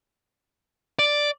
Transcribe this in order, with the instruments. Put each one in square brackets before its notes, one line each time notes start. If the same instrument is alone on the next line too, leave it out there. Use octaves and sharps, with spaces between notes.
[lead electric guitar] D5